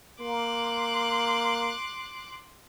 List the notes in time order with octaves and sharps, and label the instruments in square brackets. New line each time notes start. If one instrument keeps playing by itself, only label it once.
[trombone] A#3 [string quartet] C6 D6 F#6